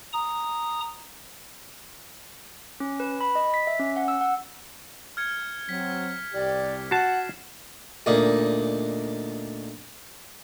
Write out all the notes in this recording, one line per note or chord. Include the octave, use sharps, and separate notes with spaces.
A#5 D#6
C#4
B4
B5
D#5
B6
E5
C#4
F#5
E6
F#5
F6 G#6 C#7
F#3 C4 B6
C2 G4 D5
F#4 F#5 A5 C7 E7
D2 A#2 D#4